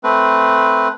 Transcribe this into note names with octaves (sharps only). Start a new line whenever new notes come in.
A3 C4 B4